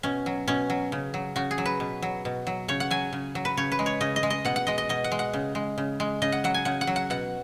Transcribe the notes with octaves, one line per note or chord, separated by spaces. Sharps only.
B2 C#4
F#3
B2 C#4
F#3
C#3
F#3
C#3 F#4
G#4
F#3
B4
B2
F#3
B2
F#3
C#3 C#5
F#5
F#3 G#5
C#3
F#3
B4
C#3 C#5
B4
G#3
C#5
C#3 D#5
D#5
G#3
D#5
B2 F#5
F#5
G#3 D#5
D#5
B2 D#5
F#5
G#3
F#5
C#3
G#3
C#3
G#3
C#3 D#5
F#5
F#3 F#5
G#5
C#3 F#5
F#5
F#3
F#5
B2 F#5